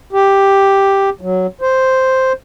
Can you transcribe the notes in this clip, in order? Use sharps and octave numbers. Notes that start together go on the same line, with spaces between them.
G4
F#3
C5